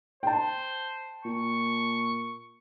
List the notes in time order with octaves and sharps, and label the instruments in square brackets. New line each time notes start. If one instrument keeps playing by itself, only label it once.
[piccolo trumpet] C5 [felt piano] G5 A5
[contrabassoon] A#2 [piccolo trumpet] C#6